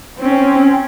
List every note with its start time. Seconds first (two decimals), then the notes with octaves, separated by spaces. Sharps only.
0.18 C4 C#4